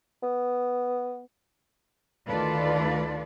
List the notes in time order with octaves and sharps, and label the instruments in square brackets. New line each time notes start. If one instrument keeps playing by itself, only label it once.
[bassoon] B3
[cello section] D2 D#3 F4 A4 B4 D5